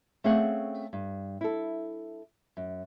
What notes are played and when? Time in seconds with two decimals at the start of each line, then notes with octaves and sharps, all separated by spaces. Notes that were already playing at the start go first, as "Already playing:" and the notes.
0.24 A3 C4 C#4 G#4 F5 F#5
0.93 G2
1.41 E4 A4
2.57 F#2